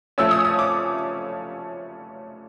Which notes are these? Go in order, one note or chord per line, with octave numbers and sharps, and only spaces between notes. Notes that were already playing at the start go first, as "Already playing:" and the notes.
F3 A3 C#4 E6
D#6
D#6
D6